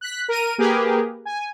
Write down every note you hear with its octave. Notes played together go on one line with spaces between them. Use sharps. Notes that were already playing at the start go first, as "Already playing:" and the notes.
F#6 B6
A#4 D#7
A#3 G4 G#4 A#4 B4
G#5